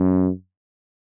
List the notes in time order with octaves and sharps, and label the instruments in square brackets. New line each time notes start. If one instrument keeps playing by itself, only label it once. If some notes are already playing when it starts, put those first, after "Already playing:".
Already playing: [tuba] F#2